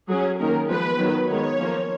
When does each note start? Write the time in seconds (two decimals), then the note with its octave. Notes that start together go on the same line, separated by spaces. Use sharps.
0.09 F#3 C#4 G#4
0.39 D#3 A#3 C#4 A#4
0.69 F3 G#3 B3 B4
0.98 D#3 F#3 B3
1.28 D#3 G#3 B3 C#5
1.58 F3 A#3 C#4